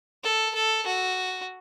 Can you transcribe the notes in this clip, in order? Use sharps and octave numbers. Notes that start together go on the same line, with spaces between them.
A4
A4
F#4